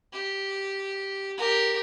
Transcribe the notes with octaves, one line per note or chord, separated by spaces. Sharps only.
G4
G4 A#4